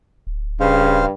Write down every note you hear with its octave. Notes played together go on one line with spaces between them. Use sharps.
D1
G2 C#3 C5 F5